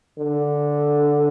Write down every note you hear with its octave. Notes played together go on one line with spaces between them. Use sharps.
D3